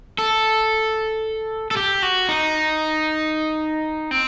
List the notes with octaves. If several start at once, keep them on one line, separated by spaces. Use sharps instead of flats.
A4
A4
G4
F#4
D#4
C4